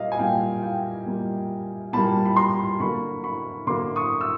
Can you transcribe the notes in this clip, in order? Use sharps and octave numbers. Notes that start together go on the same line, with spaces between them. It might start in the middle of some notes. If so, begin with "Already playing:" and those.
Already playing: A#2 G3 A#3 D#5 F5
G#5
A#2 G3 A#3 F5 G5
F5 G5
A#2 G3 A#3
A#2 G3 A#3 A5 B5
B5
A#5 C6
D3 F#3 A#3 B5 C#6
B5 C#6
D3 F#3 A#3 C6 D6
C#6 D#6
E6